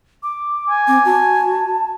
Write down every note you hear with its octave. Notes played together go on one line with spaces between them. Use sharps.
D6
G#5
C4 D6
F#4 A5